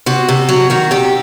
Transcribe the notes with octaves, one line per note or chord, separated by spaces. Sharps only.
C3 F#4
C3
F#3 F#4
D#3 F#4
C3 G4